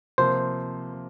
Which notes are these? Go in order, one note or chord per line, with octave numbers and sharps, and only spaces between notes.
C3 F3 A#3 C5